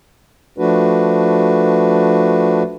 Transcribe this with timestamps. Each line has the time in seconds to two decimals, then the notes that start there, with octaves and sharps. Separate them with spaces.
0.58 F3 A3 D4 F#4 B4